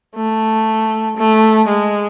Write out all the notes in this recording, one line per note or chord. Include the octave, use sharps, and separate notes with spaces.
A3
A3
G#3